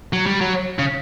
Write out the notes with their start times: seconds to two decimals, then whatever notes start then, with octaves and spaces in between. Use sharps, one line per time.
0.13 F#3
0.26 G3
0.41 F#3
0.79 C#3